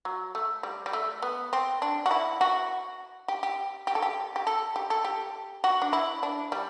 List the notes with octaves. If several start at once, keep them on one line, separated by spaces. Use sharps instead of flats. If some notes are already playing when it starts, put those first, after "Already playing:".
F#3
A3
G3
G3
A3
B3
C4
D4
F#4
E4
F#4
G4
G4
G4
A4
G4
G4
A4
G4
A4
G4
F#4
D4
E4
D4
G3